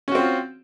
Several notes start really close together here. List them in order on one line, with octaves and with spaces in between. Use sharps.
C#4 F#4 C4 F4